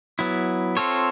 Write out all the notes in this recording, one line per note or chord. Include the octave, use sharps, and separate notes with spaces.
F#3 B3 E4
C4 F4 A4 C#5